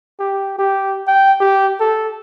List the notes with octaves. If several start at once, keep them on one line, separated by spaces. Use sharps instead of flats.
G4
G4
G5
G4
A4